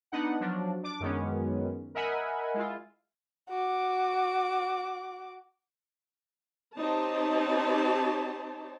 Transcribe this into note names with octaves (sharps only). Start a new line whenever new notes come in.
B3 D4 D#4 F#5
F3 F#3 D4
D4 D6
F#2 D#3 G#3 B3 C#4
A#4 D#5 E5 F#5 G#5 B5
G#3 E4 F4
F#4 D6
C4 D#4 G4 C5 C#5 A5